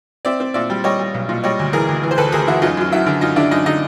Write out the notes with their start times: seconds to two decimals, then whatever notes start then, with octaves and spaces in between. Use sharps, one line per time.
0.25 C4 D5 E5
0.40 C4
0.54 A#2 D5 E5
0.70 G3
0.84 G3 C#5 D#5
1.00 G3
1.14 B1
1.29 A#2
1.44 G3 C#5 D#5
1.59 D2
1.73 E3 G#4 A#4
1.88 D2
2.03 E3
2.11 C5
2.17 D2 A4 B4
2.32 D2 G#4 A#4
2.47 E3 E4 F#4
2.62 F#2 D#4 F4
2.77 F#2 F4
2.92 F#3 E4 F#4
3.06 D3
3.21 F#2 D#4 F4
3.36 D3 D4 E4
3.51 F#2 D#4
3.66 D3 D#4